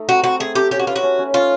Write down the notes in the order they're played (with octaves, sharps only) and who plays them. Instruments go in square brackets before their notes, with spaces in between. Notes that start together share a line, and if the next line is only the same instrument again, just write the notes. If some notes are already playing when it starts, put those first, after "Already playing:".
Already playing: [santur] A3 D#4
[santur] C4 [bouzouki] F#4
[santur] C4 [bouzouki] F#4
[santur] A3 [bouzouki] G#4
[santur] A3 [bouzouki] G4
[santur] C#4 [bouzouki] G4
[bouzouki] F#4
[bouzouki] F4 [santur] B4
[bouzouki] F#4
[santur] C#4
C#4
[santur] C#4 [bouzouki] F4